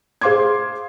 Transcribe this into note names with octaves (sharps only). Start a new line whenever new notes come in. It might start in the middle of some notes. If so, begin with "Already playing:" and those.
G#4 C5 F5 C6 D6 G#6